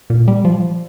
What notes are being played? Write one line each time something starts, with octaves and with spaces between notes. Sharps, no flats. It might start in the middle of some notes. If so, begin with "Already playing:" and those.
A#2
G3
F3